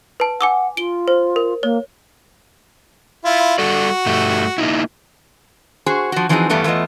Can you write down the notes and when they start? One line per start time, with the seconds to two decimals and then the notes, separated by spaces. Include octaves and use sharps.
0.20 B4 A5
0.41 F#5 G#5 D6 E6
0.77 F4 D7 G7
1.08 C5
1.36 A#4
1.63 A#3 C#5
3.25 E4 F4
3.58 G3 F#4 A4 D5
4.06 G2 G3 A3
4.58 A#3 D#4 E4
5.86 F#4 G#4 C5
6.12 F3 F#4
6.29 E3 F3 C4 D#4 F#4 G#4
6.49 E2 G2 G3 A3 B3 E4
6.64 E2 A3 B3 F4 D#5